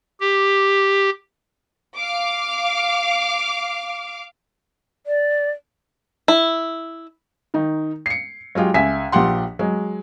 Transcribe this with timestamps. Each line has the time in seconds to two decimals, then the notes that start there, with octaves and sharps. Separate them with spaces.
0.20 G4
1.97 F5 D6
5.07 D5
6.28 E4
7.54 D#3 D#4
8.06 C7 C#7
8.55 F#3 G#3 F4 G4
8.74 C#2 E5 G#5 B6
9.12 A#1 F3 G4 F#5 C6
9.59 F#3 G#3